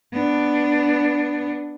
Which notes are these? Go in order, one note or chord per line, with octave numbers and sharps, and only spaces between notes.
B3 D4